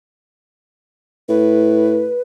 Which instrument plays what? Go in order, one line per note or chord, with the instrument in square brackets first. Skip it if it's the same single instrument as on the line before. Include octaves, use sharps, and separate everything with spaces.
[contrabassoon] A2 [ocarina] B4